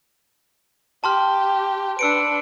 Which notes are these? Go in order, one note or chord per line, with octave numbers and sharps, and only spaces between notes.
G4 A5 C6 F6
D4 B4 E6 C#7 D7